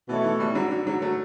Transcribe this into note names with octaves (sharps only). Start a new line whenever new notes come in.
B2 E3 A3 E4 A4 C#5
E3
E3 G3
D3 F#3
D3
D3 F#3
F#3 A3